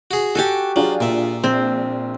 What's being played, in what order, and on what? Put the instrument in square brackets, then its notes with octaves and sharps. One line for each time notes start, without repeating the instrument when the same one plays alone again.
[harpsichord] F#4 G#4
[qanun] F#4 G4 [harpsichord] A4 G#5 A5
[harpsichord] F#3 [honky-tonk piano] D4 F4 G#4
[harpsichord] A#2 E5
[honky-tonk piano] A#1 [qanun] C4